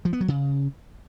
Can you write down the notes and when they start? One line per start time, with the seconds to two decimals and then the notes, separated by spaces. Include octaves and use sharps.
0.05 F3
0.13 B3
0.21 F#3
0.28 C#3